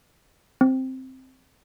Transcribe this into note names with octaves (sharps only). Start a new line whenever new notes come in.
C4